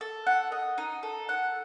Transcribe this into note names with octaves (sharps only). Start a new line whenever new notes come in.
A4
F#5
D#5
D#4
A4
F#5